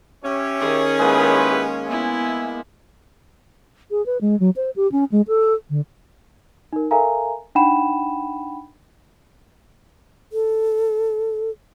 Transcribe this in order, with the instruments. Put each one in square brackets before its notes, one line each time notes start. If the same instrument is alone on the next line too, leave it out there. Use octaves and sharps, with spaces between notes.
[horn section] C#4 [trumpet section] G4 C#5 E5
[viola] D#3 G#4
[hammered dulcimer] G#3 A#3 [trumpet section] E4 G4 B4
[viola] B3 E4 [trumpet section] E5 G#5
[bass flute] G#4
B4
G#3
F#3
C5
G4
C#4
G#3
A4
D3
[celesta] D#4 A#4
A4 A#4 E5 F5 G#5 A#5
D4 D#4 F#5 G5 B5 E7
[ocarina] A4